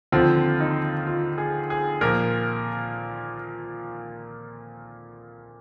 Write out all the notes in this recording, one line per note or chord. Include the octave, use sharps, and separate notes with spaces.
D#2 D3 F3 C4 F4
D#4
F4
G#4
G#4
A#2 F3 A#3 A#4